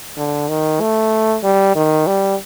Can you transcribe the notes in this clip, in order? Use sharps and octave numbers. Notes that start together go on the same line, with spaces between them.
D3
D#3
A3
G3
D#3
G3